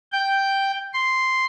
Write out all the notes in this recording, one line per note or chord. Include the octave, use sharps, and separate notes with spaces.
G5
C6